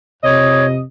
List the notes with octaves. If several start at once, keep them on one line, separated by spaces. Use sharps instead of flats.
F2 C3 C#5 D#5